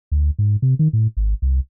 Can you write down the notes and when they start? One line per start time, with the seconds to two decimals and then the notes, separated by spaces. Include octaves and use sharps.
0.12 D2
0.39 G#2
0.62 C3
0.79 D#3
0.93 A2
1.17 G#1
1.42 C2